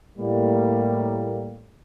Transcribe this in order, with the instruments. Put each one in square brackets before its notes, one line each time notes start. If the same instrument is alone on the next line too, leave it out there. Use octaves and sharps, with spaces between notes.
[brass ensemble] A2 G3 A#3